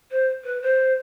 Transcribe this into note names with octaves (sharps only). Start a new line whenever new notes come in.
C5
B4
C5